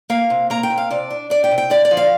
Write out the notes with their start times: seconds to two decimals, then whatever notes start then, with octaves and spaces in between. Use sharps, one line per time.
0.10 A#3 F5
0.30 C3
0.50 A#3 A#5
0.63 G5
0.70 C3
0.78 F5
0.91 C3 D5
1.11 D4
1.30 D4 D5
1.44 G5
1.51 C3
1.58 G5
1.70 D3 D5
1.85 D5
1.91 F3
1.97 F5